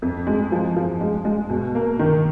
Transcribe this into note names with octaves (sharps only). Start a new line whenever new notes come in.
F2
G#3
F3
F3
G#3
G#3
B2
A#3
D#3